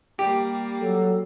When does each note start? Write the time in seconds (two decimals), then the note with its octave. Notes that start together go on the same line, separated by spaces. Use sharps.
0.19 G3 A#3 G4
0.80 F#3 A4